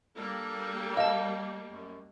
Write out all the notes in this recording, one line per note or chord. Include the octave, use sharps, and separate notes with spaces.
G3 A#3 D4 A4 A#4
D#5 F5 A5
F#2